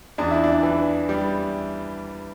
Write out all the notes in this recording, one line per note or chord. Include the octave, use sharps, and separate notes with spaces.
E2 D4
E4
D4
E3
G3